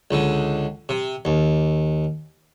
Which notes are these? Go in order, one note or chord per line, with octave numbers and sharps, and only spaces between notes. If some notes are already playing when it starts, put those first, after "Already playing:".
C#2 D3
C3
D#2